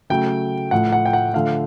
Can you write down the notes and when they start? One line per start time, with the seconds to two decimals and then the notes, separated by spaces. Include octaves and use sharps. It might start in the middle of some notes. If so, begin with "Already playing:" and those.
0.10 C#3 F#3 A3 G5
0.71 A2 F3 A3 F#5
0.93 F#5
1.06 G5
1.13 F#5
1.34 D3 F3 A3 F5